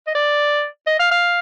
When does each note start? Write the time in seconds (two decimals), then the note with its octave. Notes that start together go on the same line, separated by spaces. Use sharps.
0.07 D#5
0.15 D5
0.87 D#5
0.99 F5
1.11 F5